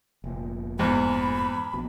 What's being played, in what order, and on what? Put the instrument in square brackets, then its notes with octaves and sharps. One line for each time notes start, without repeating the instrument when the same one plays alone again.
[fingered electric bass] F1 A#2
[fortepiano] E2 G#2 [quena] B5
[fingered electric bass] A#1 B2